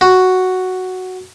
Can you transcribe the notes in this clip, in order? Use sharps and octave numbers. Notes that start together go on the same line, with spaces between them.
F#4